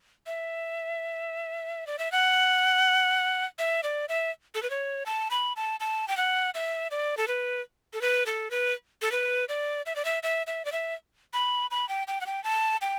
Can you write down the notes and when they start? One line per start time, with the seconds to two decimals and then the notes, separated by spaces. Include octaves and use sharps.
0.27 E5
1.87 D5
1.99 E5
2.12 F#5
3.59 E5
3.83 D5
4.09 E5
4.55 A4
4.63 B4
4.70 C#5
5.06 A5
5.31 B5
5.56 A5
5.80 A5
6.08 G5
6.17 F#5
6.54 E5
6.91 D5
7.17 A4
7.28 B4
7.93 A4
8.01 B4
8.26 A4
8.51 B4
9.02 A4
9.12 B4
9.49 D5
9.86 E5
9.96 D5
10.05 E5
10.23 E5
10.47 E5
10.65 D5
10.72 E5
11.34 B5
11.71 B5
11.89 G5
12.08 G5
12.21 F#5
12.26 G5
12.44 A5
12.81 G5